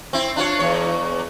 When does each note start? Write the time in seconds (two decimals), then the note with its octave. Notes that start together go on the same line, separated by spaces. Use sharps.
0.13 C4 E4
0.36 D4 F4 C#5
0.59 E2 C#5